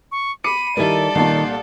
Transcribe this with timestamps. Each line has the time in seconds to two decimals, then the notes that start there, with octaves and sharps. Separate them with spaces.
0.12 C#6
0.44 B5 D6 C7 C#7 D#7
0.77 D#3 G3 E4 A4 A#4 D5
1.15 C2 A#2 D#3 A5 C7